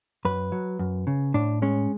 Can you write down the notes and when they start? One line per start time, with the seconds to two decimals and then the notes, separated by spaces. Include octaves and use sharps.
0.25 F#2 B4
0.52 F#3
0.79 F#2
1.07 C#3
1.34 A2 D4
1.62 G#3 C#4